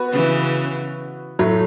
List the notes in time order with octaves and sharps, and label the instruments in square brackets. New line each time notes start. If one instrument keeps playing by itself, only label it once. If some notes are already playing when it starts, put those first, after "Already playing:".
Already playing: [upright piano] B3 F#4 B4
[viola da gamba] C#3 E3
[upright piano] A2 F#3 A3